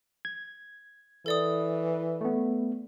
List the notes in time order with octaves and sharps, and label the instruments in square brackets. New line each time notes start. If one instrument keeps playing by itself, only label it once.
[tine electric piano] G#6
[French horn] E3 [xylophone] A4 D5 D#6
[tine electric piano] A3 B3